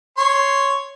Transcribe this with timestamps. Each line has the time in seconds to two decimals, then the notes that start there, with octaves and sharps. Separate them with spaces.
0.17 C#5 C6